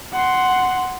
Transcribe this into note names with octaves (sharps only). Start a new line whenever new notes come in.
F#5 C6